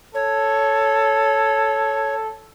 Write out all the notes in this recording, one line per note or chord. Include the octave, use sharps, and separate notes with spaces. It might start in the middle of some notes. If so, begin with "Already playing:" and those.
A4 C#5